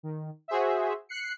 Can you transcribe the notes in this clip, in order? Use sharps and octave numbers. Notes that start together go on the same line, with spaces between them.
D#3
F#4 G#4 C5 E5
F#6 C7 C#7